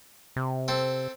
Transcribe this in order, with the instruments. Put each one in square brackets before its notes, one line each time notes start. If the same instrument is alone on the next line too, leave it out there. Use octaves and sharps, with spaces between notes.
[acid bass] C3
[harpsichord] C4 A4